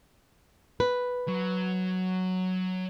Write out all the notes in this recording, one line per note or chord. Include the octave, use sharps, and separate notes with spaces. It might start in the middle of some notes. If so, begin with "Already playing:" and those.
B4
F#3